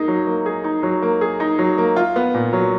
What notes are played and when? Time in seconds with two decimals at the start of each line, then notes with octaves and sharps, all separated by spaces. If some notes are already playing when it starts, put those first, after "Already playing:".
Already playing: A#3 D#4 G#4
0.08 F#3
0.27 A#3
0.46 G#4
0.64 D#4
0.83 F#3
1.02 A#3
1.21 G#4
1.40 D#4
1.59 F#3
1.78 A#3
1.96 F4
2.16 B3
2.34 A#2
2.53 F#3